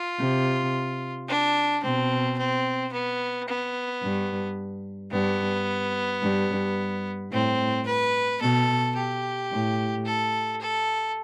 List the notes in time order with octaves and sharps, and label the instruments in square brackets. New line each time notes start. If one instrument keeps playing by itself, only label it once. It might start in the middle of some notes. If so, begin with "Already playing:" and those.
Already playing: [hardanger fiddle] F4
[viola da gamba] C3
[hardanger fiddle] D4
[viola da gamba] B2 [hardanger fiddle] C4
[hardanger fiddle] C4
B3
B3
[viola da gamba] G2
[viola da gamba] G2 [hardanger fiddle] B3
[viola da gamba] G2
[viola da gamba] A2 [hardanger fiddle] C4
[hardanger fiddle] B4
[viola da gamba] B2 [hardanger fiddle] A4
[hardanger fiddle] G4
[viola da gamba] A2
[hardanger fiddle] A4
A4